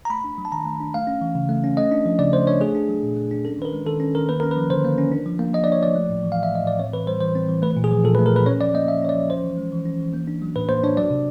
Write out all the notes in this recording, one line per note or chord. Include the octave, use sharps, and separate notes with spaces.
A#5
A3 B5
D4
F#3
A5
D#3 A#5
A3
D4
A3 F5
C#4
E3
C#3
A3
C#4
A3 D#5
D4
F3
C#3 D5
A3 C5
D4 C#5
A3 G#4
D4
F#3
A#2
A3
D4
C#4 A4
D#3 B4
A#4
G#3
D#3 A4
C#4
D#3 A#4
A#3 B4
C#4 A#4
B4
F3
D3 C5
A#3
C#4
D4
F3
A#3
F3 D#5
D4 D5
C#5
F3 D5
A3
A2
E3
A2 F5
E5
A3 D#5
A2 D5
C4 C#5
E3 B4
G3 C5
E3 C5
C4
E3
A3 B4
A#2
G#4
F3
A#2 A4
B4
A3
A#4
A#2 B4
C#4 C#5
F3 D5
A#3 D#5
F3 E5
C#4 C#5
D5
F3
C#4 C5
E3
G#3
E3
C#4
E3
A#3
D4
F#3
A2 B4
A#3 C5
D4 C#5
F#3 D5
C3